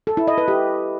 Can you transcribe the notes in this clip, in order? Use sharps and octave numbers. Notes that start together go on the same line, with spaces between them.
A4
E4
D#5
B4
G4